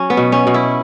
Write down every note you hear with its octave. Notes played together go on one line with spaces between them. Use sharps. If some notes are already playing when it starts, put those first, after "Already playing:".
Already playing: F#3 C#4
B3
B2
C#4
B2
E4